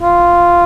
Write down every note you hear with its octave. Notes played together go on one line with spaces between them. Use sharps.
F4